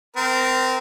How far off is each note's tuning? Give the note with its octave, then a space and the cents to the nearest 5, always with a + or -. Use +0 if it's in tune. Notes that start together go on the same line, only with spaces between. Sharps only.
C4 -20 A#4 +0